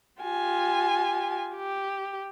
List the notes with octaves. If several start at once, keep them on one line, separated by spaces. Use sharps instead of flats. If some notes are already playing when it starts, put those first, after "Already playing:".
F4 G4 G#5
G4